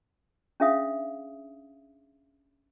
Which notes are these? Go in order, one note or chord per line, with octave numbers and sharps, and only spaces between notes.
C#4 D4 G#4 E5 F5 D#6